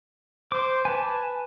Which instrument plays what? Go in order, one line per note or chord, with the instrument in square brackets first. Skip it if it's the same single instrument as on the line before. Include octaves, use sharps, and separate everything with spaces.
[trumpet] C5 [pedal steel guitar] D6
[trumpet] B4 [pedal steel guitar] G#5 A5